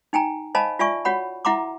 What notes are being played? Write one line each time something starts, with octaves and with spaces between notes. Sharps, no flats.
D#4 G5 G#5 A#5
C5 D#5 F5 G#5 A5 B5
F4 D5 E5 G#5 C#6
F#4 C#5 F#5 B5
E4 E5 F#5 A#5 C6 D6